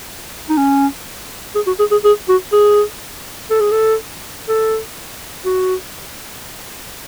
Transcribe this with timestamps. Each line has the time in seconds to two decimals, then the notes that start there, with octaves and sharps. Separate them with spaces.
0.49 D#4
0.57 C#4
1.55 G#4
1.67 F#4
1.79 G#4
1.91 G#4
2.04 G#4
2.29 F#4
2.52 G#4
3.50 A4
3.60 G#4
3.71 A4
4.49 A4
5.45 F#4